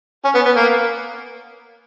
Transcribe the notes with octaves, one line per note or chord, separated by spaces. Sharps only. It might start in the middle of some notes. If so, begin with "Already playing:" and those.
C#4
B3
B3
A#3